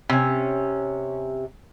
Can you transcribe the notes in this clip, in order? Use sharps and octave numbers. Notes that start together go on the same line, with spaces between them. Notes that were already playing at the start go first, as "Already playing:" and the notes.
C3 C#4